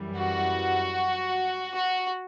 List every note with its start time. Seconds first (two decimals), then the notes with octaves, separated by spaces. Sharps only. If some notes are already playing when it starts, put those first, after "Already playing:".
Already playing: F#2 E3 G3
0.18 F#4
1.75 F#4